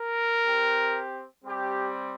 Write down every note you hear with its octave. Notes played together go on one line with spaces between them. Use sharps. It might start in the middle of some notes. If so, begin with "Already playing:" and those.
Already playing: A#4
C4 G4
G3 C4 G4